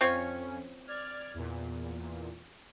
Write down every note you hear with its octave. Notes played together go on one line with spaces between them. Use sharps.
F2 C4 C#4 F4 C#5
D5 F6 G#6
E2 A#2